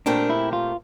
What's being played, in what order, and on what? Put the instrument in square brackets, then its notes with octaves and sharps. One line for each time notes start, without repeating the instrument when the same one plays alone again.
[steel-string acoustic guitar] A#2 A3 C4 G4 A#4 [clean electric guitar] D4
[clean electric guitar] E4
F4